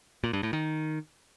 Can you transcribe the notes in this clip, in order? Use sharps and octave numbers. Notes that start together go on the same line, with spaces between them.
A#2
G2
A2
D#3